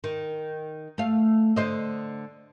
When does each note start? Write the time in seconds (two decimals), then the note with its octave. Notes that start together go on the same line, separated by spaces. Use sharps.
0.04 D#3
0.98 A3 F5
1.56 D3 C5 D#5